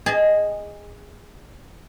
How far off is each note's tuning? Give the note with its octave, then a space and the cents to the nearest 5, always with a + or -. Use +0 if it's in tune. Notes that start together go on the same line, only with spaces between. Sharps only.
G#4 -20 D#5 +0 A5 -45